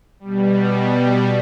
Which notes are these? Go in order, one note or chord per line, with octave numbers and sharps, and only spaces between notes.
B2 G3